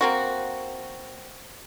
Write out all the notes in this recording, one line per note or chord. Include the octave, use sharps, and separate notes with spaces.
A#3 C4 F#4